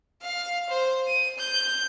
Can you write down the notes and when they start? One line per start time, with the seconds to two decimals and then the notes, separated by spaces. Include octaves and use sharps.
0.22 F5
0.70 C5
1.07 D#7
1.39 G6